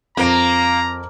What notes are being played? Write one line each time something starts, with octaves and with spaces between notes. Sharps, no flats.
F2 A#3 A#5 D7